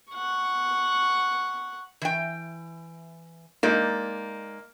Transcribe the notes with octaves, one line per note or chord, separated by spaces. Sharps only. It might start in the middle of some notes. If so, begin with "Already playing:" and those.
F#5 C#6
E3 G5
G#3 A#3 D#4 D5